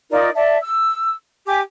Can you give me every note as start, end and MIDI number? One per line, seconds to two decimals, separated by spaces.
0.10 0.30 63
0.10 0.30 65
0.10 0.30 70
0.10 0.30 74
0.35 0.58 74
0.35 0.58 76
0.35 0.58 81
0.62 1.13 88
1.47 1.61 67
1.47 1.61 80
1.47 1.61 86